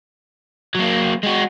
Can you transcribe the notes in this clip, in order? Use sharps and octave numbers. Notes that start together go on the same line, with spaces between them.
F#3 A#3
G#3 F#4